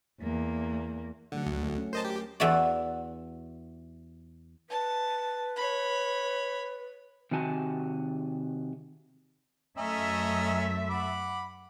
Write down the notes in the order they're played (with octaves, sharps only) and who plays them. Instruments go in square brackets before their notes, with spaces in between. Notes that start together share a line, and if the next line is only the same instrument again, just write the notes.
[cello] E2 A#3
[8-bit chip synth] D3 [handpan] F#3 A3 F#5
[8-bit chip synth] D2
[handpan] A3
C#4
[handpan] A#4 [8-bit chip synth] C5 D#5 A5
[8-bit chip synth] G4
[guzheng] E2 E3 E4 F#4 D5
[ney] B4 [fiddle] A5
[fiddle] C#5 B5
[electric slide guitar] C3 D#3 F#4 G#5 A5
[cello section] F#2 A3 E5 [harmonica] C#4 D#5 A#5
[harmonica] F#5 B5 D6